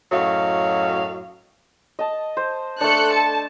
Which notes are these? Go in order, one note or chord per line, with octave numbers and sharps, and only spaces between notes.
F#2 A2 F#3 F#4 D#5 F5
D#5 A5
C5
A3 D4 A4 F#6 C#7
A5